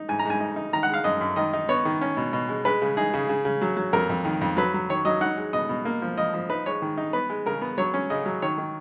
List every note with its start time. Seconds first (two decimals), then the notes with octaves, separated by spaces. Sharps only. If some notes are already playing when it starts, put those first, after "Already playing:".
Already playing: D#4
0.08 G#2 G#5
0.19 A#5
0.25 G#2 G#5
0.40 D#4
0.56 D#4
0.73 D#3 A#5
0.83 F#5
0.89 G#3 F5
1.04 F#2 D#5
1.21 F#2
1.36 D#3 D#5
1.53 D#4
1.69 B3 C#5
1.85 D#3
2.01 C#4
2.17 B2
2.33 B2
2.49 G#3
2.65 G#3 B4
2.82 C#3
2.97 D#4 G#4
3.14 C#3
3.29 C#3
3.45 C#3
3.61 F#3
3.77 F#3
3.93 F2 A#4
4.09 F2
4.25 D#3
4.41 F2
4.57 F#3 B4
4.74 F#3
4.90 D#3 C#5
5.05 F#3 D#5
5.21 D#4 F#5
5.37 G#3
5.53 B2 D#5
5.69 B2
5.85 A#3
6.02 F3
6.18 F3 D#5
6.34 F3
6.50 D#4 B4
6.66 G#3 C#5
6.82 D#3
6.97 D#4
7.13 B3 B4
7.30 G#3
7.46 C#3 A#4
7.62 B3
7.78 F#3 C#5
7.94 C#4
8.10 C#3 D#5
8.26 F#3
8.42 D#3 C#5
8.58 D#3